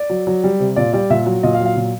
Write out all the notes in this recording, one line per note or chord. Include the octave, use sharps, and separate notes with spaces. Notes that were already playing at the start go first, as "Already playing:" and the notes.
Already playing: D5
F#3
F#3
G3
C3
A#2 D5
G3 D5
A#2 E5
F#3
A#2 D#5
F5
F#3
F5
A#2